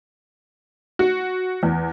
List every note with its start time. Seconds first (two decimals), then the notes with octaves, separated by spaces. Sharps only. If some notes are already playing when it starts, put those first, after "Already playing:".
0.99 F#4
1.63 E2